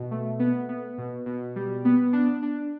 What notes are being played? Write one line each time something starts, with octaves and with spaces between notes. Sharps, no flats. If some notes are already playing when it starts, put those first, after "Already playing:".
Already playing: B2
A3
B3
B3
B2
B2
G3
B3
D4
D4